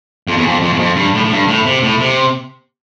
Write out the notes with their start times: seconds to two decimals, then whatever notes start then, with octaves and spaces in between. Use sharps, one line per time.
0.28 F2
0.37 E2
0.47 F2
0.62 F2
0.73 E2
0.79 F2
0.96 G2
1.14 A2
1.25 A2
1.32 G2
1.48 A2
1.66 C3
1.83 A2
2.00 C3